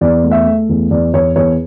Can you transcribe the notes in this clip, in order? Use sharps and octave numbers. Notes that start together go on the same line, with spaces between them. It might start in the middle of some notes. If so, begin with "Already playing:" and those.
E2 D5
A3
E5
A3
E2
E2 D5
E2 C#5
E2 C#5